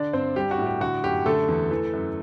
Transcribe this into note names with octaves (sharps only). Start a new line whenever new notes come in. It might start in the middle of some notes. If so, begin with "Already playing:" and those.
Already playing: D3 D4 D5
G2 C4 C5
G3 G4
F#4
A2
G4
D3 F#4
F#2 G4
D3 A3 A4
E2
E3
F#2